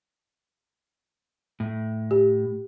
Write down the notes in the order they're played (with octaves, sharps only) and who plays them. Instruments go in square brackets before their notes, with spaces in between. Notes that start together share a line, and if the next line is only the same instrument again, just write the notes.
[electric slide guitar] A2
[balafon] G4